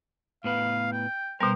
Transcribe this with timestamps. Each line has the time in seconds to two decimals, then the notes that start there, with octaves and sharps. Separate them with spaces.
0.44 A2 B3 B4 F5
0.92 G5
1.40 B2 G3 B3 A#4 C5